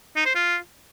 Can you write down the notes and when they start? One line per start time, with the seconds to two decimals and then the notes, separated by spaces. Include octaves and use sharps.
0.16 D#4
0.26 C5
0.35 F4